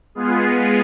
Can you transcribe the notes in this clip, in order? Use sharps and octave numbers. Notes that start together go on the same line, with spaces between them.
G#3 B3 F4 G#4